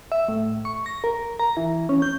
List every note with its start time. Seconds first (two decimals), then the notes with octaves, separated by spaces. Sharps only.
0.12 E5
0.28 A2
0.65 C#6
0.86 A#6
1.04 A#4
1.39 A#5
1.57 E3
1.89 C#4
2.02 G6